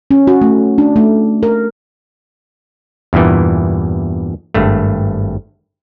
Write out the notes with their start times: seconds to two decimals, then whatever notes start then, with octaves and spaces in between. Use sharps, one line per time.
0.11 C#4
0.27 F#4
0.41 A3
0.78 D4
0.96 A3
1.43 A#4
3.13 E2 G2 A#2 E3
4.54 G#1 G2 A3